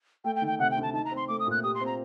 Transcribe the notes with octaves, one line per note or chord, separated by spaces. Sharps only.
A3 G5
G5
D#3
G5
C3 F#5
G5
D2
A5
D#4 A5
A#5
C4
C6
A3 D6
D#6
A#2 F#6
G4 D#6
C6
C4
A#5